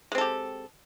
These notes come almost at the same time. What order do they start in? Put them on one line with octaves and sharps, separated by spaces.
G#3 C4 A4 G4